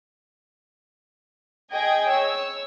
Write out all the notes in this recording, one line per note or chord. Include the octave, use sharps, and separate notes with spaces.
G#4 D#5 G5 G#6
C#5 E6